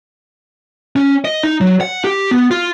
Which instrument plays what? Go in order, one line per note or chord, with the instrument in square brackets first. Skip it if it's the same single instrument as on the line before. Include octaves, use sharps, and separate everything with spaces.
[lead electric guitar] C#4
D#5
D#4
F#3
F#5
G4
B3
F4